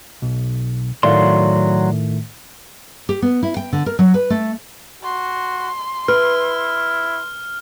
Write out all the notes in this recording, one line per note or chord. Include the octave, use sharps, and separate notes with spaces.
B1
A2 D#3 F#3 A3 D5 F5 C6
G4
B3
E4
G5
D3
A#4
F#3
B4
A3
F#4 C6
E4 B4 F6